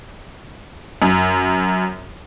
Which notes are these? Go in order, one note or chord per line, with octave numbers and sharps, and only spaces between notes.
F#2